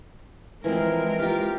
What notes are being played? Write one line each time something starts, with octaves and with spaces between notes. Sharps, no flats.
E3 F3 G#3 C4 A#4
F4 G4